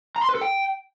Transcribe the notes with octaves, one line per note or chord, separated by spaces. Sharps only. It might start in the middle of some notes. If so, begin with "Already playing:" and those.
A#5
C6
B4
A4
G5